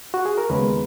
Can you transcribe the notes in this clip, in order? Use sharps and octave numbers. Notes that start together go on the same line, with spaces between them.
F#4
G#4
A#4
D#2 C#3 G#3 B3 B4